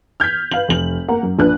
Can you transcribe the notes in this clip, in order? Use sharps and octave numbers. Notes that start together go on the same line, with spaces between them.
F6 G6 G#6 B6
B4 F5 F#7
F1 F#7
A#3 F#5 A#5
F#2
A#1 D4 B4 F#6